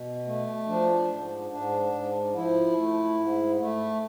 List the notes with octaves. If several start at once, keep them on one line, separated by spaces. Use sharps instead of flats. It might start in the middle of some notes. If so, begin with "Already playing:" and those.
Already playing: B2
A3
F3 D4
G#2
G#2 D4
G#2
F3 E4
A3
G#2
A3